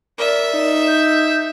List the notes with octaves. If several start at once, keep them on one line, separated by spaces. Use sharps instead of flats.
A#4 D5 E5
D#4
G6